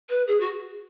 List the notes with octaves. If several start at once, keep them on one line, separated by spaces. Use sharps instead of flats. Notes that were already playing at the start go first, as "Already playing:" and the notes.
B4
G#4
F#4